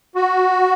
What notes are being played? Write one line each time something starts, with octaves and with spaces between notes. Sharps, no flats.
F#4